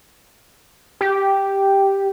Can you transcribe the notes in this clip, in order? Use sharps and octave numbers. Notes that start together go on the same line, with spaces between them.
G4